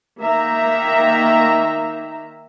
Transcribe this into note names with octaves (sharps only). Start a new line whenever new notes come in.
D#3 A#3 E5 A#5